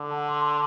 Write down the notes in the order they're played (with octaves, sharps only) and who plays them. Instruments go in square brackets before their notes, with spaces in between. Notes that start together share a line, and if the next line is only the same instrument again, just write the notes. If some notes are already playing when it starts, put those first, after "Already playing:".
Already playing: [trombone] D3
[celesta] F#5 A5
A5 C6